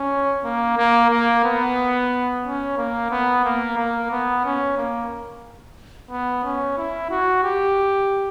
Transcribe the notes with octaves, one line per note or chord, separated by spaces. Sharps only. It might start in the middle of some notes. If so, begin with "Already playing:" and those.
Already playing: C#4
A#3
A#3
A#3
B3
C#4
A#3
B3
A#3
A#3
B3
C#4
A#3
B3
C#4
E4
F#4
G4